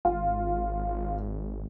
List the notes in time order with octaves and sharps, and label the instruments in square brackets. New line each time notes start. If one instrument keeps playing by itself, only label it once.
[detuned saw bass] G#1 [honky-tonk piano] F4